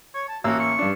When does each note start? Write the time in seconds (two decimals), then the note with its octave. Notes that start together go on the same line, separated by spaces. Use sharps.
0.14 C#5
0.28 A5
0.44 A1 A#3 F#4 E6
0.59 C#6
0.79 G2 D4